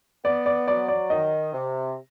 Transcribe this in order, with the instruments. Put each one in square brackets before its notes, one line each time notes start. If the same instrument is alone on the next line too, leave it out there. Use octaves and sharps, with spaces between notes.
[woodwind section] B3 [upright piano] D5
[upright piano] D5
[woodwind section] F#3 [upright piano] D5
[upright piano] D5
[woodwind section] D#3 [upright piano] D#5
[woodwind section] C3